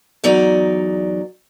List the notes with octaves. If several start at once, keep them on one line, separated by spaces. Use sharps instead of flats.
E2 F#3 D#4 D5